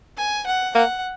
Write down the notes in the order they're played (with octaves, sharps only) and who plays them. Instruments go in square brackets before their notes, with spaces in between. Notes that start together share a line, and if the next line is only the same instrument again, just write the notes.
[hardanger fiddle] G#5
F#5
[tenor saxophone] A#3 [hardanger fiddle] F#5